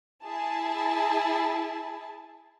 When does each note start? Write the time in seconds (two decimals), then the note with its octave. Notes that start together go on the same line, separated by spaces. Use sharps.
0.24 E4 G#4 A5